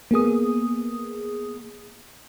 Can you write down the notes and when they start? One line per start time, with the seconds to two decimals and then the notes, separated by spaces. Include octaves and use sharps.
0.11 A#3 B3 G#4 D#6